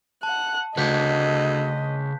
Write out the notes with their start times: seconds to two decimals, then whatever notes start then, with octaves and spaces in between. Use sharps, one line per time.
0.23 F#5 A5 F#6
0.77 D2 C#3 G#4 B4 D#5 F#6 G6 B6